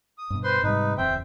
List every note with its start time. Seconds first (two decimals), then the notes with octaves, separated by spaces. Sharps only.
0.18 D#6
0.30 G2 B2
0.44 B4 C5 C6
0.63 G#2 C3 G3 D#4 B4
0.97 D1 E2 C4 C5 E5 G5